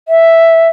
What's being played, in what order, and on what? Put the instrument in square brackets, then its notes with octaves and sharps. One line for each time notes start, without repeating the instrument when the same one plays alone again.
[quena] E5